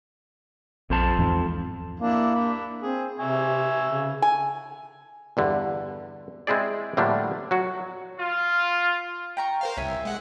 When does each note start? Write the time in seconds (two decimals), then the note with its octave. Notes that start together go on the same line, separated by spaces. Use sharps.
0.90 A#1 F2 C5 A5
1.19 E2 G#2 E3
2.00 A#3 D4 E4
2.35 D4 B5
2.82 C4 G#4
3.19 C3 E5 G#5 C#6
3.85 C#3
4.22 G#5
5.37 E2 G2 D3
6.47 G#3 C4 E4 G#4 D5
6.97 A2 D3 F3 G3 A#3 D4
7.51 F#3 F#4
8.20 F4
9.37 G5 A#5 C#6
9.61 A#4 C5 F5
9.77 C2 C#5 E5 G#5
10.05 G#3 F#5